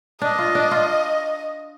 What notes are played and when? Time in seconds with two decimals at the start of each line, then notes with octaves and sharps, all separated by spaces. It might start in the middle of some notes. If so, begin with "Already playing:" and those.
0.22 D4 D#5
0.39 F4
0.55 D4
0.71 F4